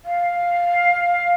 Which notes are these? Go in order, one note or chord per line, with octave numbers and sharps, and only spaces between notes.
F5